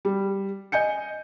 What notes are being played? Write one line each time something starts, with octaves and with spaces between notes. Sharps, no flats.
G3
D#5 G#5 G6 C#7